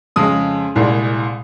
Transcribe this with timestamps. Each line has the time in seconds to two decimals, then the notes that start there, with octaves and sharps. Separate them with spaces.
0.16 F2 C#3 G#3 D#6
0.75 C2 A#2 G#3